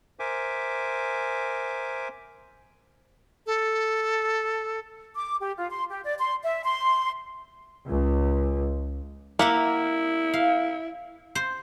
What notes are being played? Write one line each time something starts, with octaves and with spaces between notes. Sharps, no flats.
A#4 C5 E5 G#5 D6
A4
D6
G4
F4
C6
G4
D5
C6
E5
C6
C#2
A#3 E4 A#4 E5 F#5
F5
C5